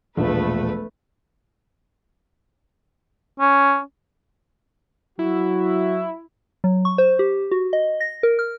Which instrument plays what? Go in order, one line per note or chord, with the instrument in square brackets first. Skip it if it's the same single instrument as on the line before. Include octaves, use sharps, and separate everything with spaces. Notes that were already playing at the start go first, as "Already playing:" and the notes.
[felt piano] E1 A#1 F3 [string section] A3 B4
[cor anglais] C#4
[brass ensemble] F#3 F#4 [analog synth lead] E4
[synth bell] F#3
C#6
C5
G4
F#4
D#5
A#6
A#4
F6